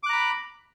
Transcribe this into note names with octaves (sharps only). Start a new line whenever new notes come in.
A#5 B5 D6 F#6